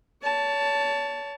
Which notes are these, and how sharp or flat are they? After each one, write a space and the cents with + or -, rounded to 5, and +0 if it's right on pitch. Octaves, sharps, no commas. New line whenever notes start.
C#5 +35 A5 +0